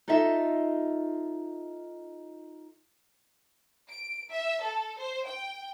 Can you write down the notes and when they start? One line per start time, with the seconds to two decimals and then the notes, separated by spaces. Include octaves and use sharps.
0.08 D#4 F4 A4 D#5 E5
3.90 D7
4.31 E5
4.62 A4
4.98 C5
5.27 G5